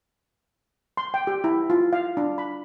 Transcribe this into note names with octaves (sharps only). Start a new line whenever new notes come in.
C6
G5
G4
E4
F4
F5
D4
B5